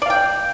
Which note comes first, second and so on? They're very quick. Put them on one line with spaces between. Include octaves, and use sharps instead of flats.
D5 F5 G5